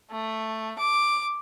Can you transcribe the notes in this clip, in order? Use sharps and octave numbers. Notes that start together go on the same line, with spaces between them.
A3
D6